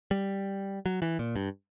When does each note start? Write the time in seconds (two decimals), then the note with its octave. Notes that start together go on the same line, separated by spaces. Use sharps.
0.11 G3
0.86 F#3
1.02 E3
1.19 A#2
1.36 G2